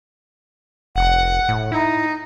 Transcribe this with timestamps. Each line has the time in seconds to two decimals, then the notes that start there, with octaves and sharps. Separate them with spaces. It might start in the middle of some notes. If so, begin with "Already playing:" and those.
0.96 F1 F#5
1.49 A2
1.72 D#4 E4